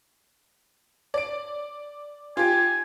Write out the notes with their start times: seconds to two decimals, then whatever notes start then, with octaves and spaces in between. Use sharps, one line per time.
1.14 D5 D7
2.37 F4 G4 G#5